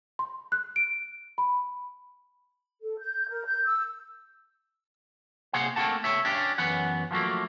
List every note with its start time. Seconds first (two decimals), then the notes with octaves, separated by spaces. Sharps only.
0.19 C6
0.52 F#6
0.76 D7
1.38 B5
2.82 A4
2.99 G6
3.29 A#4
3.45 G6
3.65 E6
5.53 C2 C3 A#3 G#4 C5 F#5
5.76 A3 A#3 C4 F#4 F#5 A5
6.04 C#2 C#5 E5
6.25 C#4 D4 G4
6.58 F#2 E3 B3 C#4 F#5
7.11 F3 F#3 A3 A#3